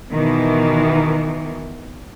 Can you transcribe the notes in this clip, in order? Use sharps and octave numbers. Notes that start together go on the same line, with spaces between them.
B2 D#3 E3